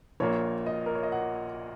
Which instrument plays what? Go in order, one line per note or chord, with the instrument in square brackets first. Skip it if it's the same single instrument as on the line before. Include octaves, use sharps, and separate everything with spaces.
[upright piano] A#1 A#2 A#3 C#5
D#5
A#4
C#5
D#5
F#5